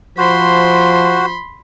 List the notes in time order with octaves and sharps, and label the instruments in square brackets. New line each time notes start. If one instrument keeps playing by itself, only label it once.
[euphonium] F3 [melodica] F#4 C5 [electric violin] B5 C6